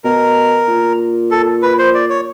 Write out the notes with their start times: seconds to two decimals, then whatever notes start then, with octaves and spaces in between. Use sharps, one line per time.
0.04 B2 A#4
0.68 A#2
1.31 A4
1.62 B4
1.79 C5
1.94 D5
2.10 C#5